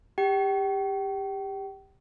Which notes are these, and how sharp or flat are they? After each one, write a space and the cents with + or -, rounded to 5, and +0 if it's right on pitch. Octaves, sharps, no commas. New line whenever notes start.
G4 +20 G5 -35